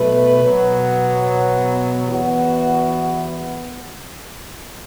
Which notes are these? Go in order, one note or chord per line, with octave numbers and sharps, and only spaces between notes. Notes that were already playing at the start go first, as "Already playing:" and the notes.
Already playing: B2 F#3 A3 B4
B2 F#3 B3
E2 E3 B3 F#4